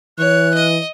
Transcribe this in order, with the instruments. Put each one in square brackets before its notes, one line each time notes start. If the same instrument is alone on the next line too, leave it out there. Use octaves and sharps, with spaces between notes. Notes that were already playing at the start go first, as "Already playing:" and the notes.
[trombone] E3 [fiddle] C#5 [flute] F#6
[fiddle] D#5